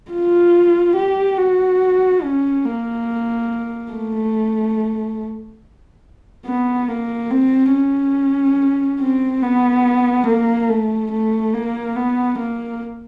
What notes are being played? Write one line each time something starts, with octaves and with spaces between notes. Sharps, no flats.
F4
G4
F#4
C#4
A#3
A3
B3
A#3
C4
C#4
C4
B3
A#3
A3
A3
A#3
B3
A#3